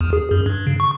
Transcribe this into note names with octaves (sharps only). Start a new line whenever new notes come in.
E2
G#4
F#2
G2
C#3
C#6